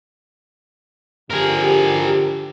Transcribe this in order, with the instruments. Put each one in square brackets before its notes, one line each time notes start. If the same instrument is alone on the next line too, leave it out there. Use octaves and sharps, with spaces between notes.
[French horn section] D3 F3 G4 [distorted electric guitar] G#4 A#4